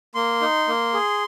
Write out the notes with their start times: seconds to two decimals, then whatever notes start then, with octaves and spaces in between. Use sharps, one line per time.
0.15 A#3 C6
0.41 D#4
0.68 A#3
0.94 G#4